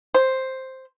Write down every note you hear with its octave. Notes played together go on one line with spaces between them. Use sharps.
C5